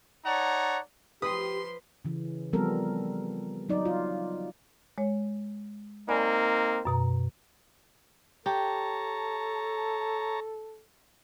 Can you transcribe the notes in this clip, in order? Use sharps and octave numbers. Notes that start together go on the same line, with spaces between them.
D#4 C#5 D5 F#5 A5 A#5
F3 G4 B4 C6 D#6
C#3 E3
F3 G3 B3 C4 A4 A#4
F#3 D#4 D5
F4
G#3 C#5
A#3 C4 D#4 D5 G#5 B5
F#2 B2 A#5
G4 A4 C#5 A5 A#5